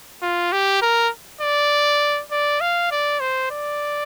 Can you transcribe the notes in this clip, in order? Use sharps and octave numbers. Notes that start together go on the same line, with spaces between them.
F4
G4
A#4
D5
D5
F5
D5
C5
D5